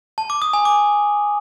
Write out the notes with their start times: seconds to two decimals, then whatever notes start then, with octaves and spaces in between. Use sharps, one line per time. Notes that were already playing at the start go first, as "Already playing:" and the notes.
0.18 A5
0.30 D6
0.42 D#6
0.53 G#5
0.65 D6